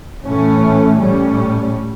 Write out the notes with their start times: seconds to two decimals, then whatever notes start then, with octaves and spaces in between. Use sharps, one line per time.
0.25 A2 E3 A3 C#4
0.98 A2 G3 C#4